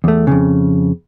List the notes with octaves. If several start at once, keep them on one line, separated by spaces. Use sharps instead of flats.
E2 A3
F2 A2 C#3